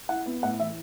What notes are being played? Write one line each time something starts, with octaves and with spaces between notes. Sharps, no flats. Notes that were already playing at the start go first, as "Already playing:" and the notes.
E4 F#5
B3
A2 F#5
E3 E5